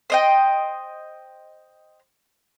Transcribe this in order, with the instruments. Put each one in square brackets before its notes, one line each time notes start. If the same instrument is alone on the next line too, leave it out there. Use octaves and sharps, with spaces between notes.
[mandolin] C5 D#5 G5